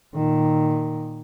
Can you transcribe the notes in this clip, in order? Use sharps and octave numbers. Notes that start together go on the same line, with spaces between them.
A#2 D#3